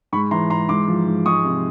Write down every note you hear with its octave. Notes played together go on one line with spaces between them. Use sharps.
G#2 B5 C#6
E3 A#5 C6
G#2 A#5 C6
G#2 C6 D6
F3
G#2
G#3 C#6 D#6
C3